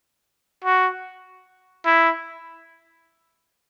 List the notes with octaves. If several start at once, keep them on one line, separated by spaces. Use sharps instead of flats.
F#4
E4